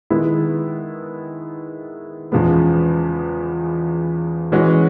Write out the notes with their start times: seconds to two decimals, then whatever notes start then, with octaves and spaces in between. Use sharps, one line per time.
0.10 D#3 G#3 B3 E4
2.32 E2 C#3 F3 G#3 B3
4.52 E3 G#3 C#4 F#4